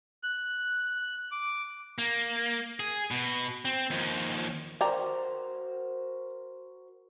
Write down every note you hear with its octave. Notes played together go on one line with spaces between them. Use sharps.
F#6
D6
A#3
G#4
B2
C4
D#2 F3
F#4 A#4 C5 D5 G5 A#5